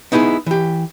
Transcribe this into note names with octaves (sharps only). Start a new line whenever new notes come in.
B3 D#4 E4 G4 G#4
E3 G4